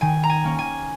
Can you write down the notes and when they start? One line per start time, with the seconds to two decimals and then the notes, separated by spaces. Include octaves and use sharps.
0.01 D#3 G#5
0.24 A#5
0.30 G#5
0.44 A#3 C#4
0.59 G#5